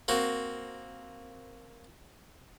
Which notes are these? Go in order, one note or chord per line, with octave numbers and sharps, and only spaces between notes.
A#3 C4 F#4